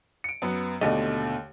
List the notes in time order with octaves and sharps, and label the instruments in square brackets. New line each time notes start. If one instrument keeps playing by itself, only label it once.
[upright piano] C#7 D7
F#2 B3
[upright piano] D#2 D3 A3 [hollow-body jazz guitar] B2 D#5